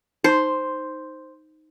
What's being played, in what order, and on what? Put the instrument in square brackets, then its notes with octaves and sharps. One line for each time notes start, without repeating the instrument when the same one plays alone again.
[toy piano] D#4 C6 [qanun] C5